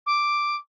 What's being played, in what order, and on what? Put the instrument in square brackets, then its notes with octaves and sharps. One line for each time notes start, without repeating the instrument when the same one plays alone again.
[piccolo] D6